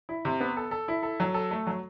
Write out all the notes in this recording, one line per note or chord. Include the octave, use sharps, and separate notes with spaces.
E4
C3
B3
A4
A4
E4
A4
F#3
A4
A3
F#3